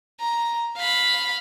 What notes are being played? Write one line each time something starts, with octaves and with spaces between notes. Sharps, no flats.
A#5
F5 B5